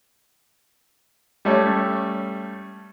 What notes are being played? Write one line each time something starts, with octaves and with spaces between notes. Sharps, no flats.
G3 A3 C#4